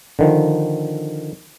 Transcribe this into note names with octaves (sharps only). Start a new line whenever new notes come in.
D3 D#3 F3